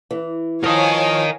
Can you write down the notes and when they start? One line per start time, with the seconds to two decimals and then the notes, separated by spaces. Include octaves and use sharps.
0.11 E3
0.64 F3 A#4 C#5 D#5 F5 G#5